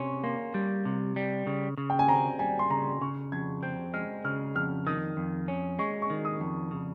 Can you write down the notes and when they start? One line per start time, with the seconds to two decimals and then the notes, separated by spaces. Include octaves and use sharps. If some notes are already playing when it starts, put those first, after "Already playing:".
Already playing: C3 C#4 C6 C#6
0.24 A#3 C6
0.54 G3
0.85 C3
1.16 G3
1.47 C#3
1.78 C#3
1.90 G5
1.99 G#5
2.08 C4 A#5
2.39 G3 G#5
2.59 C6
2.70 C#3 A#5
3.01 C#3 C#6
3.32 F2 G#6
3.63 C4 G6
3.94 G#3 F6
4.24 C#3 F6
4.55 F2 F6
4.87 D#3 D#6
5.17 F2
5.48 C#4
5.79 G#3 C#6
6.02 C#6
6.10 D#3
6.25 D#6
6.40 F2
6.71 C#3